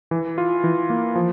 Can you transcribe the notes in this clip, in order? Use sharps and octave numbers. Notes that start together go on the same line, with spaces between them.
E3
F4
E3
A#3
F3